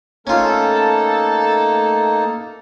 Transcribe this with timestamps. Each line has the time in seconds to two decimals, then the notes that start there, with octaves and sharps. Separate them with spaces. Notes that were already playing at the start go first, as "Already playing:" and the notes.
0.27 A3 A#3 C#4 D#4 F4 A4